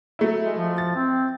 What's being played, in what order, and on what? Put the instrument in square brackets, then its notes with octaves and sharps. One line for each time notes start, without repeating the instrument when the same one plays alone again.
[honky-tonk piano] F#3 A3 E4
[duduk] G#3
F3
[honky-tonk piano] A6
[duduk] C4